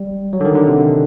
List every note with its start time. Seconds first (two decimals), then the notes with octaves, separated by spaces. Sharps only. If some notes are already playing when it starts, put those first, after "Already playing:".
Already playing: G3
0.33 F#3
0.41 D3
0.45 D#3
0.56 D3
0.67 C3